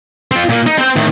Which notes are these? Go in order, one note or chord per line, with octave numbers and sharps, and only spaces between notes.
C4 F4
A#2 A#3
D#4
C4 C5
A2 D#3